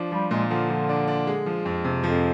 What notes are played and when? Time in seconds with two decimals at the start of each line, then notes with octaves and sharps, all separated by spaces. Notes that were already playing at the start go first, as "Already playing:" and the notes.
Already playing: F3 D4
0.12 F3 G3
0.31 A#2 G#3
0.50 D3 F3
0.70 F3
0.89 D4
1.08 D4
1.27 G#3
1.46 F3
1.65 F2
1.84 C3
2.03 F2 F3